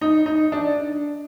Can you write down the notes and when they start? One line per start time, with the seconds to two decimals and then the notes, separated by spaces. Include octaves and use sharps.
0.01 D#4
0.26 D#4
0.52 D4